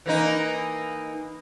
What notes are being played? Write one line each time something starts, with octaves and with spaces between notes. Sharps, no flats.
E3 A#3 D#4